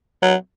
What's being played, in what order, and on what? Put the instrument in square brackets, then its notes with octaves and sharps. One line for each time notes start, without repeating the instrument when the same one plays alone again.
[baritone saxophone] F#3